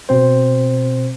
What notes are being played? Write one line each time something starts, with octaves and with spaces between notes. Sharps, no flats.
B2 C4 C5